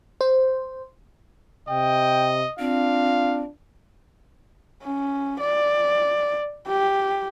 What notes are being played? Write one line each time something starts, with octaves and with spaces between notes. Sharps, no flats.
C5
C3 D#5 G5
C4 D4 F4 F5
C#4
D5
G4